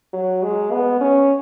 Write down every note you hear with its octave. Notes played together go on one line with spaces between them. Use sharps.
F#3
G#3
B3
C#4